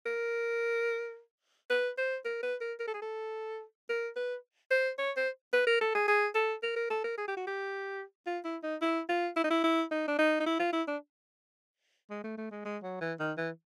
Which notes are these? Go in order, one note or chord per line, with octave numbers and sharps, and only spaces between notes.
A#4
B4
C5
A#4
B4
A#4
A#4
A4
G#4
A4
A#4
B4
C5
C#5
C5
B4
A#4
A4
G#4
G#4
A4
A#4
A#4
A4
A#4
G#4
G4
F#4
G4
F4
E4
D#4
E4
F4
E4
D#4
E4
E4
D#4
D4
D#4
D#4
E4
F4
E4
D4
G#3
A3
A3
G#3
G#3
F#3
E3
D#3
E3